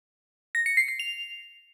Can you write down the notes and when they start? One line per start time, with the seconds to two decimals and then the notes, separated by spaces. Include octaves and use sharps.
0.55 A#6
0.66 C#7
0.77 C7
0.88 C7
0.99 F7